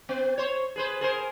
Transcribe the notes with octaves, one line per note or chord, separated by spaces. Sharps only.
B3
C5 C#5
G#4 B4 C5
G#4 A#4 C5